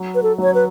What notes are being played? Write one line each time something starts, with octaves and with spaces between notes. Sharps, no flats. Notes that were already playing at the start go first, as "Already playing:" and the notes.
Already playing: F#3
B4
A4
F#3 C#5
B4